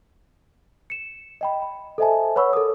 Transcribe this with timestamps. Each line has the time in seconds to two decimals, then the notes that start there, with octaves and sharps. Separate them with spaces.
0.90 C#7 E7
1.41 D#5 G5 B5
1.62 B5
1.98 A4 C5 D#5 E5 G#5 A5
2.36 B4 C#5 F#5 B5 C#6 E6
2.53 A4 A#4 D6 D#6